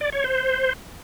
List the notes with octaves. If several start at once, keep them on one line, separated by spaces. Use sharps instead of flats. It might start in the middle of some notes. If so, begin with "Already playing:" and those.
D5
C#5
C5